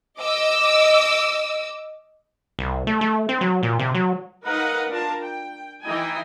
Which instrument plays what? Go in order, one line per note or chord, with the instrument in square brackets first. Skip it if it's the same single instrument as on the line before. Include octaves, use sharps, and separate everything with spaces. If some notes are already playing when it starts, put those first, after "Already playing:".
[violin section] D#5 D6 E6
[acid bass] C2
A3
A3
C4
F#3
A#2
C3
F#3
[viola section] D#4 A#4 B4 D#5 F5 F#5
D4 F4 A#4 A5
G5
E3 D#4 E4 D#5 G5 G#5